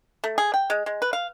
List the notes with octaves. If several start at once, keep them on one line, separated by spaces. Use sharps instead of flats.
A3
G#4
G5
G#3
G#3
B4
F5